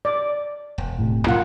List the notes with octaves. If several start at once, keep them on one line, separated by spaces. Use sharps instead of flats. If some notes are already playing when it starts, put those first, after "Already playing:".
D5
E1
A2 C3
A1 G#2 F#3 A#3 F4 F#5